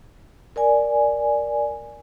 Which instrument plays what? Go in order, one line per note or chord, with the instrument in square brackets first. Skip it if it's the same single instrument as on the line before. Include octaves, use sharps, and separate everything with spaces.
[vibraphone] A#4 D5 G#5